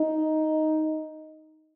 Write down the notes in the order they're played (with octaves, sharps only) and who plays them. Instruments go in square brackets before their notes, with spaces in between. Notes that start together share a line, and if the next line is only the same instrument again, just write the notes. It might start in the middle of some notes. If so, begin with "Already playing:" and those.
Already playing: [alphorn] D#4